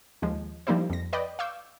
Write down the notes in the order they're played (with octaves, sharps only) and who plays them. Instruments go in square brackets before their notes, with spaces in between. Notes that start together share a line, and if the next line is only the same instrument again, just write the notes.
[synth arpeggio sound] D#2 F3 G#3
F3 G3 A#3 D#4 E4 C5
F2 A#6
B4 D5 D#5 G5 B5
F5 C#6 D6 E6 G6